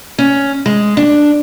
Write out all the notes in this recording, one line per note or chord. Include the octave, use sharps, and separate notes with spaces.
C#4
G#3
D4